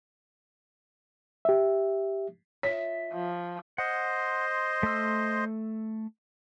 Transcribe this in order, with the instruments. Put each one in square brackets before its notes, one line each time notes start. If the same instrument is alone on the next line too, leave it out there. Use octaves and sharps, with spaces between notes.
[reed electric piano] G4 E5
[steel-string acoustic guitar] F4 D#5 E5 [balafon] C#5 [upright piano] B6
[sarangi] F3
[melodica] C5 D#5 C6 [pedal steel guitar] F#5
[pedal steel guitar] A3 E6